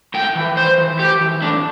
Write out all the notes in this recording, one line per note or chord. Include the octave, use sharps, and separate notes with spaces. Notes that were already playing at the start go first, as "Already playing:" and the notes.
A2 G5
E3
A2 C5
E3
A2 G4
E3
A2 D4